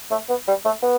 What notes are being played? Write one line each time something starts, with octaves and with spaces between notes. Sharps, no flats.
A3
B3
G3
A3
B3